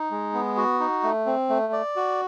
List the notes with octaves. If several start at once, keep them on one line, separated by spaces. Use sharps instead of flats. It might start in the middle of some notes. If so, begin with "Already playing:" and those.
Already playing: D#4
G#3
B3
F#4
D#4
A3
C4
A3
D5
F#4